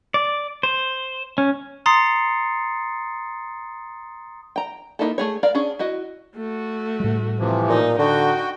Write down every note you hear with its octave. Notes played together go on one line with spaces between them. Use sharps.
D5
C5
C#4
A#5 C6 D#6 A6 C7 C#7
G5 A#5
A#3 C4 D#4 E4 A4
A3 G#4 C#5
A#4 D5 F5
C#4 D4 G#4
E4 F#4 D#5
A3 F#4
A2 G3
C3 E3 F3
A#2 D#4
D3 D#4 F#4 G5